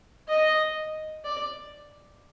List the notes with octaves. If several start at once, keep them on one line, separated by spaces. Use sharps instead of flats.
D#5
D5